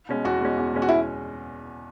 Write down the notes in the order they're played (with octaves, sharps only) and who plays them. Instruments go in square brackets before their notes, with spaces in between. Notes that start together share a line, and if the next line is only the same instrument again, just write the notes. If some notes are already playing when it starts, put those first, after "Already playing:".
[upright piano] B2 G#3 C#4
[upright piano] E2 [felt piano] F#4
[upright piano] B2 G#3 C#4
E2
B2 G#3 C#4
[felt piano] F#4
E4